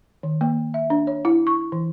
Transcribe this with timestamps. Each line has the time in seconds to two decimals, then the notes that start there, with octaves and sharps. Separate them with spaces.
0.23 D#3
0.41 A#3
0.74 E5
0.90 D4
1.07 C#5
1.25 E4
1.47 C#6
1.72 E3